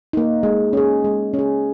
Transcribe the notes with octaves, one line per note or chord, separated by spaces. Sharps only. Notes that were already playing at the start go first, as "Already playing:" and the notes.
A#3 D#4
G#3
C#4 G#4
G#3
C#4
G#4